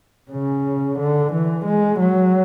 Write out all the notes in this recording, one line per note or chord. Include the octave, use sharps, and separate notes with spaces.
C#3
D3
E3
G#3
F#3